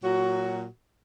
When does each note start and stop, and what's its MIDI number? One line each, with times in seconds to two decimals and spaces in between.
0.03 0.65 46
0.03 0.65 54
0.03 0.65 66